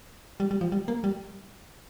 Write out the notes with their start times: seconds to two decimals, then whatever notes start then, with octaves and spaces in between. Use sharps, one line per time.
0.40 G3
0.51 G3
0.61 F3
0.72 G3
0.88 A#3
1.04 G3